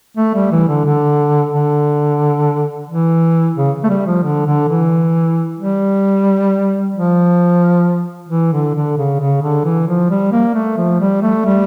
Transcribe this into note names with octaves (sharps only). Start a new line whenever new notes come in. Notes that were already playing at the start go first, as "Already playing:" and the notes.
A3
G3
E3
D3
D3
D3
E3
C#3
A3
G3
F3
D3
D3
E3
G3
F3
E3
D3
D3
C#3
C#3
D3
E3
F3
G3
A#3
A3
F3
G3
A3
G3